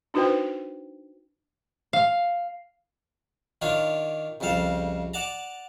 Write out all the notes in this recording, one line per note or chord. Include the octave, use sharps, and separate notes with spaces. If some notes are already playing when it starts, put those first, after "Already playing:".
D4 D#4 F#4 B4 C5 G5
F5
D#3 D4 F4 C#5
C2 F2 C#3 A4 F5
D5 F#5 A5 A#5